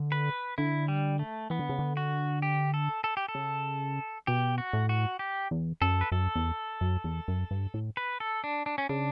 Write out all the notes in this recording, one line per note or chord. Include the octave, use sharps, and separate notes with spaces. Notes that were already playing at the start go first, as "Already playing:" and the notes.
Already playing: D3
B4
D3 E4
G3
A3
E3 B3
D3
C#3
D3
F#4
G4
A4
A4
G4
A4
C#3
B2 G4
F#4
A2
F#4
G4
E2
F#2 A4
B4
F#2 A4
E2
F#2
E2
F#2
G2
A2
B4
A4
D4
D4
C#4
C#3 D4